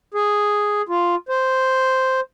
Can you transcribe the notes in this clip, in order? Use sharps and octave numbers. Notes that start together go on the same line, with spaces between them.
G#4
F4
C5